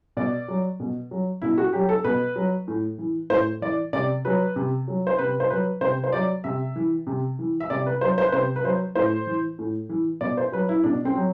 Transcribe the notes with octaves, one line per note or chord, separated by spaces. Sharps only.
B2 D5
F#3
B2
F#3
B2 E4
F#4
F#3 G4
A4
B2 B4
F#3
A2
E3
A2 C5
E3 D5
C3 D5
F#3 B4
C3
F#3
C5
C3 B4
C5
F#3 B4
C3 C5
C5
F#3 D5
C3 E5
E3
C3
E3
E5
C3 D5
B4
F#3 C5
C5
B4
C3 C5
B4
F#3 C5
A2 C5
E3
A2
E3
B2 D5
C5
F#3 B4
E4
B2 D4
C4
F#3